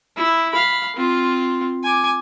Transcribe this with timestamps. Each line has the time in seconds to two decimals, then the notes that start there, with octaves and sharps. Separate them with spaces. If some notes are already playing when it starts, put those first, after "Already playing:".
0.17 E4
0.53 F5 B5
0.96 C4 F4
1.83 G#5 D6